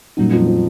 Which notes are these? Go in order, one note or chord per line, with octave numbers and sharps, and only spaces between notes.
F#2 A#2 F#3 G3 A#3 D#4
F2 F3
F3